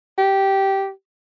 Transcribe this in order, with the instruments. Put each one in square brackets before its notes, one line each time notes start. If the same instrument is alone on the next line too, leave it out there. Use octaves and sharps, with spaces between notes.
[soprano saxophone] G4